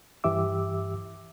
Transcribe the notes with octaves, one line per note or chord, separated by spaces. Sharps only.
G2 E3 G4 E5 D6 E6